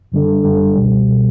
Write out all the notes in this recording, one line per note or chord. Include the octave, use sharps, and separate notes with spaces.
F#2 D3 G3 D4 A4
F#2 D3 G3 D4 A4
C#2 B2 G3
B2 G3